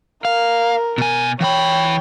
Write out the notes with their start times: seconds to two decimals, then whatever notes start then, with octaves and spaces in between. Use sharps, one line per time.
0.25 A#4 F5
0.98 B2 G#5
1.41 E3 C#5 G5 B5